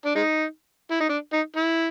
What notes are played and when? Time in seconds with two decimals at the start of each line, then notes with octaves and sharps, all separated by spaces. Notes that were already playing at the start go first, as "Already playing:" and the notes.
0.06 D4
0.16 G#3 D#4
0.92 E4
1.00 D#4
1.10 D4
1.33 D#4
1.57 E4